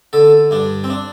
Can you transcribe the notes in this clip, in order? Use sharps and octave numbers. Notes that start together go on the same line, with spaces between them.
D3 A4
G2 D4
C4
D4